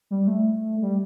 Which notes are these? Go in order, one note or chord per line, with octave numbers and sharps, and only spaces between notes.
G3
A3
G3